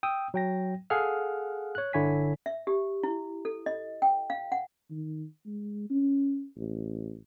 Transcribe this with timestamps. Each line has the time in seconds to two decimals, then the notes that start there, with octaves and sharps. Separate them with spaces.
0.03 G5 D#6 E6
0.34 F#3 G5 A#6
0.90 G#4 A4 F5 F#5 F6
1.75 C#5 F#6
1.93 G1 D3 E4 C#5 G#5 B6
2.46 E5
2.67 G4
3.03 E4
3.45 A4
3.66 D#5
4.02 G5
4.30 F5
4.52 F#5
4.90 D#3
5.46 G#3
5.90 C#4
6.57 A1